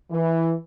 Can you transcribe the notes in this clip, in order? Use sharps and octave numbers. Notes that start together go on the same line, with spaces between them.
E3